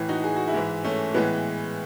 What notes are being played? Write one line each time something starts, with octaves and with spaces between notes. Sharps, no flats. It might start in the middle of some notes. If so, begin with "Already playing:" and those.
Already playing: A2 E3
D#4 F#4
G#4
F#4
E4 G#4
G#2 E3
A3 C#4
A2 E3 G#3 B3